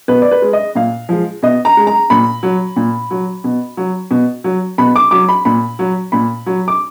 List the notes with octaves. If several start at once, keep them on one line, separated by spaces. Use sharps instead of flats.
B2 B4
D5
B4
G#3
D#5
A#2 F5
F3 G#3
B2 D#5
A#5
G#3
A#5
A#2 B5
F#3
A#2
F#3
B2
F#3
B2
F#3
B2 B5
D6
F#3 D6
B5
A#2 B5
F#3
A#2 B5
F#3
D6